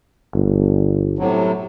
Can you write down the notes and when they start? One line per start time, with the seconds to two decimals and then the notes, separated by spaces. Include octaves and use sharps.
0.34 G1
1.19 A2 C3 F#3